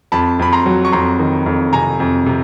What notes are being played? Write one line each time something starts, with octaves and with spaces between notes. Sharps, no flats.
F2 A5 B5
F2 B5
A#5 C6
F#3
C#6
F2 A#5 C6
D#3
F2
C3 G#5 A#5
F2
C3